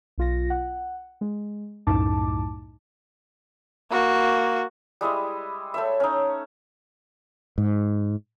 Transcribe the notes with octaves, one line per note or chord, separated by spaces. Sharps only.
B1 F4 A#6
F#5
G#3
C2 F#2 A2 D#4 A5 D6
A#3 F#4
G3 G#3 E4 D#5
A3 C#5 E5
C#4 D#4
G#2